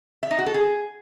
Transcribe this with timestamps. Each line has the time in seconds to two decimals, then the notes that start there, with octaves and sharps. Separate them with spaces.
0.23 E5
0.31 D#4
0.39 F#4
0.46 A4
0.54 G#4